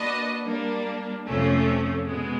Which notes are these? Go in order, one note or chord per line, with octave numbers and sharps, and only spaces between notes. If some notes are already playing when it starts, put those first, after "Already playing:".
Already playing: A#3 D4 F#4 B4 D#5
G3 A#3 D4
F2 C3 F3 A3 C#4
B2 G#3 B3